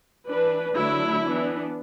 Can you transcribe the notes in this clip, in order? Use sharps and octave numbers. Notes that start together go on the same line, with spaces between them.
E3 D4 B4
D3 F#3 A3 D4 E4
E3 B3 D4